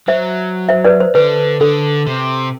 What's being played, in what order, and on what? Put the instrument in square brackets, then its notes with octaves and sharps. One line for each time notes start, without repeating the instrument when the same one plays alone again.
[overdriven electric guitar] F#3 [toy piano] C5 E5
[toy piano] C5 E5
B4 D5
C5
[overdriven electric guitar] D3 [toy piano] B4
[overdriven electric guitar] D3 [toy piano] A4
[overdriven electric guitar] C3